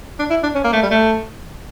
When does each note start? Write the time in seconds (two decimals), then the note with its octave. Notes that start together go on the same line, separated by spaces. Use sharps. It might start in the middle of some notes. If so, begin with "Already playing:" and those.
0.19 D4
0.30 E4
0.43 D4
0.55 C#4
0.64 A#3
0.73 A3
0.83 G3
0.91 A3